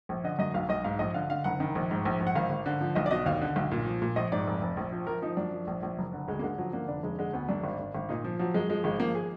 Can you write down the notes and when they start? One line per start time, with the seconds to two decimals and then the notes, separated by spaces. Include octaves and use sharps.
0.09 A#1
0.24 D3 D#5
0.39 F#2 D#5
0.54 B1 F5
0.69 B1 D#5
0.84 G#2 F5
0.99 A#1 D#5
1.14 D3 F5
1.30 D3 F5
1.44 F#1 F#5
1.60 D#3
1.75 A#1
1.91 G#2
2.05 A#1
2.20 A#1
2.27 F#5
2.36 G#1 F5
2.50 G#1
2.66 D3
2.81 F3
2.95 B1 D#5
3.06 D5
3.11 B2 D#5
3.26 D#2 F5
3.41 D3
3.56 B1
3.71 A#2
3.86 F3
4.02 A#2
4.16 A#1 D#5
4.32 G#2 D5
4.47 F1
4.61 F1
4.77 A#1
4.92 F3
5.07 F3 A#4
5.22 F3 D#4
5.37 F#2 D4
5.52 F3
5.67 A#1
5.83 A#1
5.98 F#1
6.13 D3
6.28 D2 G#3
6.39 A#3
6.43 D3 G#3
6.58 F3 F#3
6.73 D3 A#3
6.88 F1 D4
7.03 F1 G#3
7.18 D3 G#3
7.33 D2 B3
7.48 F#2 D4
7.64 G#1
7.79 G#1
7.95 G#1
8.09 A#2 D#4
8.24 F3
8.39 F3 F#3
8.54 F#2 G#3
8.70 F3 G#3
8.84 G#1 G#3
9.00 F3 A#3
9.15 G#4